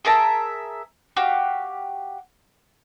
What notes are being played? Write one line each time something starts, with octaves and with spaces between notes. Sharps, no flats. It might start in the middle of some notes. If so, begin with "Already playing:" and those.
G#4 A#4 E5 A5
F#4 G4 F5